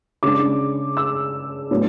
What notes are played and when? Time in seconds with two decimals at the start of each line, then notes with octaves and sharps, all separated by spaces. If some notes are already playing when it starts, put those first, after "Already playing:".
0.23 C#3 G#3 D4 D6
0.97 E6
1.71 A2 F#3 B3 D4